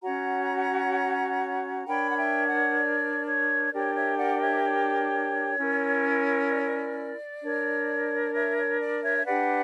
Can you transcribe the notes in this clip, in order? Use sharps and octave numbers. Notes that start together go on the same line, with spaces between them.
C#4 F#4 C#5 F#5 A#5
D4 A#4 C#5 G5 B5
F#5
E5 G5
D5 F#5
D5
C#5
D4 G4 A#4 C#5 D5
D5
C#5 E5
D5 F#5
C#5 E5
C#5
C#4 E4 A#4
D5
C#5
D5
D4 A#4 C#5
D5
C#5 E5
C#5
D5
C#5 E5
E5
D4 G4 B4 D5 F#5